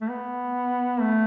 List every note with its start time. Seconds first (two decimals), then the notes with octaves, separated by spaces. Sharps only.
0.01 A3
0.09 B3
1.01 A3